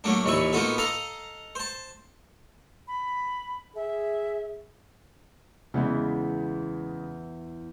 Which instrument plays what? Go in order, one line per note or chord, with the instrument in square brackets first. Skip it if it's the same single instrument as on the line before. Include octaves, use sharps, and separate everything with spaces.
[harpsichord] F#3 A3 A#3 D4
D#2 A#2 E3 E5 C#6
A#3 B3 D#4 F4 F#4 A4
A4 D#5 F5 A#5
C5 A5
[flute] B5
[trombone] G#4 [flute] E5
[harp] E2 E3 B3 [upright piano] C#3 G#3